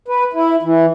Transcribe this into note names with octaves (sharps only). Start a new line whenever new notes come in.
B4
E4
E3